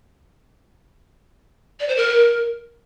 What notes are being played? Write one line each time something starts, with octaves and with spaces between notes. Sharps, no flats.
D5
C5
A#4